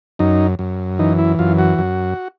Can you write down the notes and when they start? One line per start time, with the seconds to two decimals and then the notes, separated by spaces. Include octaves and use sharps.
0.19 F#2 D#4
0.59 F#2
0.99 E3 D#4
1.18 E4
1.39 F#2 F4
1.59 F#4
1.78 F#2